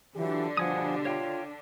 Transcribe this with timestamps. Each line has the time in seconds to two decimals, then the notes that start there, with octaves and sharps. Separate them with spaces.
0.16 D3 E3 F#3 D4 F4 G4
0.57 B2 F3 G3 F#5 G#5 D#6
1.05 F4 C#5 F5 G5